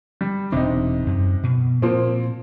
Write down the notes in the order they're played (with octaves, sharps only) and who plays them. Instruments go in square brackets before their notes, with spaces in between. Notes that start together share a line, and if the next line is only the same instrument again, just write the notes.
[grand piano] G3
[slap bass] E1 D4 [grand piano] C3 D#4
[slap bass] F#2
B2
[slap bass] A#2 [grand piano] F3 A#3 C4